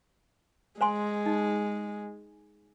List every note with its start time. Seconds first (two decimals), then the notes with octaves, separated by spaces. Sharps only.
0.81 G#3 C5 G#5 C6
1.26 D#4